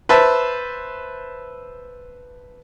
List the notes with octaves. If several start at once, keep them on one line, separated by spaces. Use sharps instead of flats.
B4 C5 E5 A5